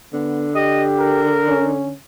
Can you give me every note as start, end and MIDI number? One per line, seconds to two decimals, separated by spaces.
0.13 1.98 50
0.13 0.48 59
0.55 1.35 67
0.55 0.83 75
0.99 1.69 70
1.48 1.92 61